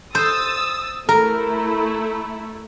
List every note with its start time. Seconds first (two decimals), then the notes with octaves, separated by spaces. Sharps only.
0.15 C5 D#6 E6 A6
1.09 A3 E4 A#4